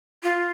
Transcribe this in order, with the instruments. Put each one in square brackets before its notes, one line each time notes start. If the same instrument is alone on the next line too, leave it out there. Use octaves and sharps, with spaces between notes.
[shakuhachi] F4